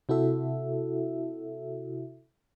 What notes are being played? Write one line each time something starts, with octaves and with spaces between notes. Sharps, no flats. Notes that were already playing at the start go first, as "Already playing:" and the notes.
C3 E4 F#4 A4 E5